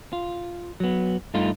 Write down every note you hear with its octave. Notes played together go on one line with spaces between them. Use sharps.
F4
F#3 B3
G2 A3 D#4 F4